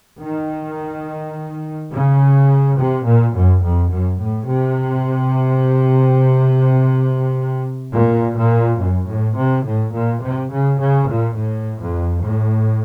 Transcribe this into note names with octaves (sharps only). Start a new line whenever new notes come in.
D#3
C#3
C3
A#2
F#2
F2
F#2
A2
C3
A#2
A#2
F#2
A2
C3
A2
A#2
C3
C#3
C#3
A#2
A2
F2
A2